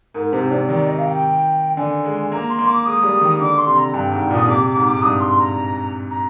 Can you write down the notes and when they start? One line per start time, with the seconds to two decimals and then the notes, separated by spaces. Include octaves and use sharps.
0.14 G#2 A#4
0.32 C3 C5
0.51 C3 D5
0.69 D#3 D5
0.86 D#5
0.98 F5
1.05 G5
1.77 D3 G#5
2.05 G#3
2.31 A#3 A#5
2.49 C6
2.59 A#3
2.67 D6
2.86 G#3 D#6
3.03 G3
3.21 D#3
3.40 D3 D6
3.57 C6
3.66 C3
3.76 A#5
3.94 G2 G5
4.12 G#2
4.30 A#2 D#6
4.48 C3 D6
4.66 D6
4.75 G#2
4.85 D6
4.92 G#2
5.02 G2 D#6
5.20 C6
5.39 A#5
6.10 A#5